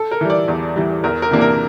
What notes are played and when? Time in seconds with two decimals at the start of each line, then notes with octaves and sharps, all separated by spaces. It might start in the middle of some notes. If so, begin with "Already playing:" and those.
Already playing: A4
0.11 A#4
0.21 E3 G3
0.30 D5
0.48 E2
0.76 E3 G3
1.04 E2 A#4
1.22 A#4
1.31 C3 E3 A#3 D4
1.41 A#4